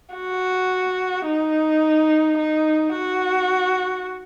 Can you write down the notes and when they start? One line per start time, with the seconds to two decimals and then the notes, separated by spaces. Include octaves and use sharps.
0.14 F#4
1.26 D#4
2.37 D#4
2.93 F#4